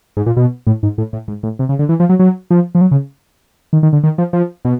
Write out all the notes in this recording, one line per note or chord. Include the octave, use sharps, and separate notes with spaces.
G#2
A#2
B2
A2
G#2
A2
A2
G#2
A2
C3
C#3
D3
E3
F3
F#3
F#3
F3
F3
F#3
C#3
D#3
D#3
D3
D#3
F3
F3
B2